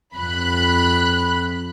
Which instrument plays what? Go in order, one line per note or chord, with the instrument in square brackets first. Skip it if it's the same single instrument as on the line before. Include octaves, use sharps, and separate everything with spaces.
[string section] F2 B5 F#6